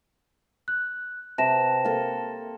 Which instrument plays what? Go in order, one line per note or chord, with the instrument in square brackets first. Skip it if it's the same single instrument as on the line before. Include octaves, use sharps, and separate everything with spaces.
[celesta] F#6
[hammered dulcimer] C3 B4 [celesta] A5 A#6 E7
[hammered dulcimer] A#3 A4